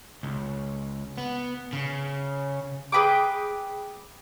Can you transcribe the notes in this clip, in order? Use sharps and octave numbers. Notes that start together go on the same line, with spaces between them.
C#2
B3
C#3
G#4 B4 G5 D6